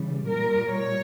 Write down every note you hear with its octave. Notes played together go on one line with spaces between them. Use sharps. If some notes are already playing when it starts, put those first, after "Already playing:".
Already playing: C#3 E3 G3
A#2 G3 A#4
C#5